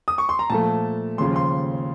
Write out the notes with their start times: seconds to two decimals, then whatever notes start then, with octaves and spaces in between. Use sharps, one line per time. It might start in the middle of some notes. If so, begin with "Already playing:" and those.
0.08 D#6
0.18 C#6
0.29 C6
0.39 A#5
0.50 A#2 F3 A3 A5
1.18 D#2 C#3 F3 C6
1.36 C6